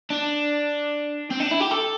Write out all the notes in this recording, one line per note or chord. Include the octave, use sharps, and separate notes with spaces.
D4
C4
D4
E4
G4
A4